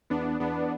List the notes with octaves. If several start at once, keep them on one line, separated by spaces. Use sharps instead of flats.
E2 B3 D4
E2 B3 D4